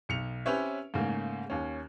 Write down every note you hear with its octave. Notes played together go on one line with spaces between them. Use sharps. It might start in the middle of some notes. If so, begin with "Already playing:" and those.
B1 C#7 F7
C4 C#4 G4 B4 C#5 E5
G#2 C#3 A3 A#3
D#2 C#4